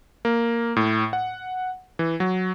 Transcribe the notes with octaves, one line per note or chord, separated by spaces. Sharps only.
A#3
A2
F#5
E3
F#3